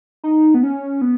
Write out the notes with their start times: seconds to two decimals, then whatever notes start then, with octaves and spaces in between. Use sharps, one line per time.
0.24 D#4
0.54 B3
0.63 C#4
1.02 B3